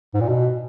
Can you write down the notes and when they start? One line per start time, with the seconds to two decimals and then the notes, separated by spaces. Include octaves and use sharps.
0.14 G#2
0.21 A#2
0.29 B2